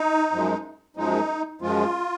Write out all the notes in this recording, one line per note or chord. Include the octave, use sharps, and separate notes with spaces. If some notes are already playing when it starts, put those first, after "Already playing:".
Already playing: D#4
F#2 F3 G#3
F#2 F3 G#3 D#4
F#2 F3 G#3 F4